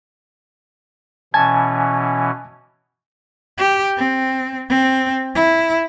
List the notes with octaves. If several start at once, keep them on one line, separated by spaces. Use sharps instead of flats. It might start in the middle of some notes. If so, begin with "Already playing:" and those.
B2 E3 C#4 G#5 A5 G#6
G4
C4
C4
E4